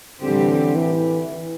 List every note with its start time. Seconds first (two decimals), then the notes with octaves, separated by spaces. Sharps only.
0.22 A2 D3 E3 G3 C4 G4
0.76 E3